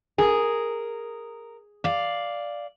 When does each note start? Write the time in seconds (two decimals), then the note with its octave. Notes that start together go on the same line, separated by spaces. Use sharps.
0.18 G#4 A#4
1.84 D5 F5